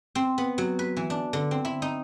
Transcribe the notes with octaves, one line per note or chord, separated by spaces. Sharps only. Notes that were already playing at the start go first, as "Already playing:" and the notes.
C4
B3
F#3
B4
E3
D4
D3
C4
E4
D#4